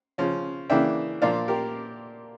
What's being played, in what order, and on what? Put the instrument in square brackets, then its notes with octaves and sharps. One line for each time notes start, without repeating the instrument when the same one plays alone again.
[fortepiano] C#3 F3 C#4
C#3 E3 A#3 D4 E5 G5
A#2 F3 A#3 D4 D5 F5
G4 A#4